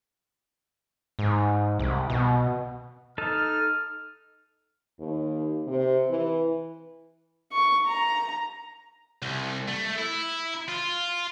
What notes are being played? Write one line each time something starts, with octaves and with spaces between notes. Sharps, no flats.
G#2
C2
B2
D#4 A4 A5 F6
D#2
C3
E3
C#6
A#5
C2
A3
E4
F4